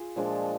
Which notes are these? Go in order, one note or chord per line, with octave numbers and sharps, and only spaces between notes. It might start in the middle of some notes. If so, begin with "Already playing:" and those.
Already playing: F4 G#4
A#2 F3 G#3 D4